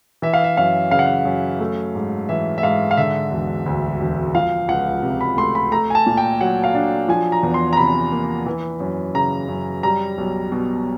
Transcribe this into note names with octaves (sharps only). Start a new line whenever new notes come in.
E3 E5
F5
E5
F#2 F5
C#3 F5
F#5
F5
F#2
A3
G#2
E3 E5
E5
G#2 F5
F5
D3 E5
E1
D2
E1
F3 F5
C#2 F#5
C3
B5
A3 C6
B5
A3 A#5
G#5
A5
A#2
G5
F#3 F#5
F5
D4
F3 G#5
A#5
E2
C6
A#5
C3 B5
A#3
E3
F#2
C#3 A#5
F#2
G3 A#5
B1
B2